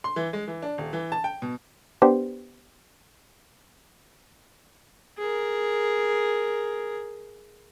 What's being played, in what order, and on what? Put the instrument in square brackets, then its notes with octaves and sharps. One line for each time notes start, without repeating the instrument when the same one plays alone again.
[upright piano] C6
E3
G#3
E3
D4
D#1
E3
A5
G5
B2
[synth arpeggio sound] B3 D4 G4 C5
[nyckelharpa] G#4 A#4